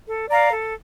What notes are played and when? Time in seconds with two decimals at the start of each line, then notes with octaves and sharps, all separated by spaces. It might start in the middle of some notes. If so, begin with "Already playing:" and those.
0.07 A4
0.29 D5 F5 A#5
0.51 A4